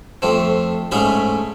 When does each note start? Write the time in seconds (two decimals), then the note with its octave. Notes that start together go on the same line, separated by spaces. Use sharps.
0.22 F2 A3 C4
0.91 G#2 A3 C#4 D4 G#4 B5